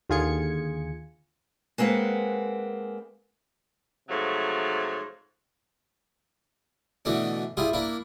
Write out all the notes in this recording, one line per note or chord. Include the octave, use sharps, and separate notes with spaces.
D#2 D3 F4 G#4 G#6 C#7
G#3 A#3 C4 B4 F#5
G#2 C3 F3 F#3 A3
B2 D3 E3 A3 D4
G3 E4 F4 G#4
A#3 D4 E4